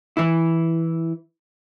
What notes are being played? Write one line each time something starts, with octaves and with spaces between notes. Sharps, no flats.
E3 E4